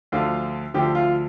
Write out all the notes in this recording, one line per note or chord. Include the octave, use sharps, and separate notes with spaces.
D2 D3 F3 F4
D2 D3 F3 G4
F4